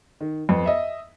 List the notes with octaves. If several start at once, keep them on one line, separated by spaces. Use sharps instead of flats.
D#3
F2 B3
D#5 E5